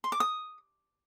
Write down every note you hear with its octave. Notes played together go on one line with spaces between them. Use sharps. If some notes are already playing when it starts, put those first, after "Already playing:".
C6
D6
D#6